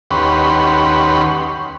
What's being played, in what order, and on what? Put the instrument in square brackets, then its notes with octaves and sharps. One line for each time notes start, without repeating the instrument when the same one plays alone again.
[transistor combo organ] D#2 C#4 G4 B4 F#5 C6